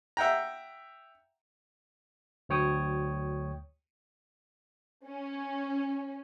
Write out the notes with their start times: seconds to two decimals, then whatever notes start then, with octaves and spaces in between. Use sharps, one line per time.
0.17 E5 F#5 G5 A#5
2.49 D2 F#3 C#5 G5 D#6
5.06 C#4